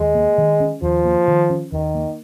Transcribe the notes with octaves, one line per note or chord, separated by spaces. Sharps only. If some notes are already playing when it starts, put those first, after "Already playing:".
Already playing: D#2 G#3
A#3
D#3
C#4
D#2 F3
A#3
D#3
C#4
D#2 D#3
A#3